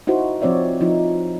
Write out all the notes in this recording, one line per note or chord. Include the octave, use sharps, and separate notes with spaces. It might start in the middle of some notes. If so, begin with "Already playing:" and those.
D#4 E4 F#4 C5
F3 C4 C#5 D5 E5
F3 D#4 E4